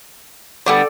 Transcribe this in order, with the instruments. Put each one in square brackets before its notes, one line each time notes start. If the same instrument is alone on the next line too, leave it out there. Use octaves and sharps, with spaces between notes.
[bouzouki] D3 G3 B3 [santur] A4 D5